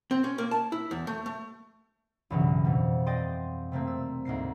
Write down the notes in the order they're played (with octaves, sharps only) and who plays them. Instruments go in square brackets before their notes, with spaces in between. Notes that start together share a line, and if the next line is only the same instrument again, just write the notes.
[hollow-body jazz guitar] C4
C#4
A#3
A5
E4
E2
A3
A3
[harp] B1 G2 C#3 E3 F#3
F2 B2 G3
D5 D#5 G5 C6
C3 A3 A#3 C4
E6
D2 G#2 A#3 C7